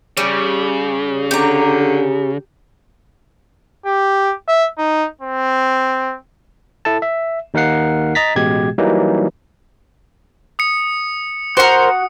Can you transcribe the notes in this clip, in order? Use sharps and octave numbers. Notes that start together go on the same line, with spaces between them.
C#3 G3
D3 G4 A#5
G4
E5
D#4
C4
E4 A4 A5
E5
D#2 D#4 A#4 F5 F#5 C7
D#5 A#5 A6 B6
A1 B2 G#3 G4 G#6
E3 F#3 G3 A#3 D#4
D#6 C#7
F#4 A#4 C5 F#5